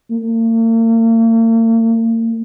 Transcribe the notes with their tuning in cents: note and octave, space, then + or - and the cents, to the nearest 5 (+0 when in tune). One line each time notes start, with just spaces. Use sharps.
A#3 -45